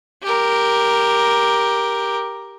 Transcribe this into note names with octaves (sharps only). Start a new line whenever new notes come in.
G4 A#4